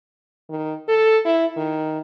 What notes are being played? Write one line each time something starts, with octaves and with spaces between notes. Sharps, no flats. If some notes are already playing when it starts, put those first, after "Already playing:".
D#3
A4
E4
D#3